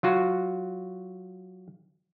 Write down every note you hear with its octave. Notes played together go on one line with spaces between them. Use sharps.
F#3 F4 F#4